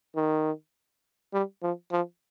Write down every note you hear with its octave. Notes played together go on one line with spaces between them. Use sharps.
D#3
G3
F3
F3